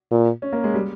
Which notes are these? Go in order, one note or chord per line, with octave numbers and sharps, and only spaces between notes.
A#2
C#4
A#3
G#3
G3